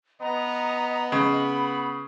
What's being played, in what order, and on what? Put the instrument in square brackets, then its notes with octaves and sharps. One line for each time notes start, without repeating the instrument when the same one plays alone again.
[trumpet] B3 [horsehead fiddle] D#5 [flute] A#5
[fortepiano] C#3 [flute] B5